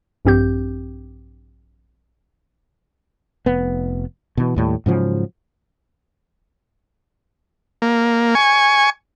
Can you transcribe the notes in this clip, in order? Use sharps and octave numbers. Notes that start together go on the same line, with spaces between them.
A#1 G2 C4 G4 G6
F1 B3
B2 E3
D#2 A2 G3
G#2 C#3 F3 F#3
A#3
G#5 C#6